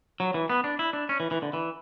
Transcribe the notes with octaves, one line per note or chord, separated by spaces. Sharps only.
F#3
E3
B3
D4
E4
D4
C#4
E3
E3
D3
E3